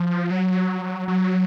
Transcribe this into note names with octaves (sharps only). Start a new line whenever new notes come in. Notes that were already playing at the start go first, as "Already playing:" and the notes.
Already playing: F3
F#3
F#3